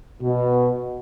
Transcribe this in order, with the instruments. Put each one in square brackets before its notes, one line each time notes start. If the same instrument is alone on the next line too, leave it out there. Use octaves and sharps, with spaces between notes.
[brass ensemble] B2